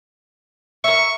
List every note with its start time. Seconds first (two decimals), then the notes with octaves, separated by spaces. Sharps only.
0.84 A#4 E5 C#6